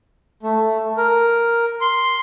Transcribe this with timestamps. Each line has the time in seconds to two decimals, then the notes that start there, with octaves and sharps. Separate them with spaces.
0.43 A3
0.97 A#4
1.81 C6